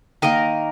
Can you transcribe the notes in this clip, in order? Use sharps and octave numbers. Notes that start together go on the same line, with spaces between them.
D#3 A#3 A#4 D#5